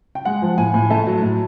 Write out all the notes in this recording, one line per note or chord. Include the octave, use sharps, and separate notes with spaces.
G5
G#3 F#5
F3
A2 G#5
A2
A3 A5
F#3
A2